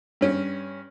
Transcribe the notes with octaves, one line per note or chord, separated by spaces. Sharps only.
G2 C#4